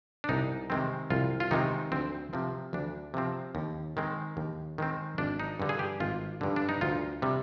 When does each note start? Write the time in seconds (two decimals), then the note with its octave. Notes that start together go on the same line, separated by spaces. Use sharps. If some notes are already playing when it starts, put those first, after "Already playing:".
0.24 D4
0.29 C2 D#4
0.70 C3 D#3 G#3 C4
1.10 C2 F4
1.40 F4
1.51 C3 D#3 G#3 C4 D#4
1.92 D2 C4
2.33 C3 F3 C4
2.73 D2 D4
3.14 C3 F3 C4
3.55 D#2
3.97 D#3 G#3 C4
4.37 D#2
4.78 D#3 G#3 C4
5.18 G#1 D4
5.40 D#4
5.60 G2 D3
5.69 G#4
5.79 G4
6.00 G#1 F4
6.41 G2 D3
6.56 D4
6.69 D#4
6.81 D2 F4
7.22 C3 G3